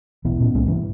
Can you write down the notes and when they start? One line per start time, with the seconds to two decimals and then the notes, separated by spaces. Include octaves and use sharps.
0.25 D#1 B1 E3 B3
0.40 A#2 B3 C#4
0.55 C2 G#3 A#3 C#4
0.67 G2 E3 G3